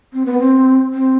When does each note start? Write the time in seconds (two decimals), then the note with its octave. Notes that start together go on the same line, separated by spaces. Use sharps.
0.13 C4
0.26 B3
0.39 C4
0.94 C4